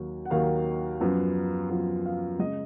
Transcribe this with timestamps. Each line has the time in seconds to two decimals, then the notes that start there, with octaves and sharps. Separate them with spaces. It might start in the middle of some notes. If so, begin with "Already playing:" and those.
Already playing: D#2 D#3 F#3 A#3
0.25 F#5
0.30 D#2 D#3 F#3 A#3 F5
1.00 F#2 F3 B3
1.70 F#2 F3 B3
2.05 F5
2.39 C#3 G#3 D#5